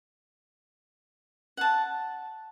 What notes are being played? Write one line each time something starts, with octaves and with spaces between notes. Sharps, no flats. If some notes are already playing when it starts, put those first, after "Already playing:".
F#5 A5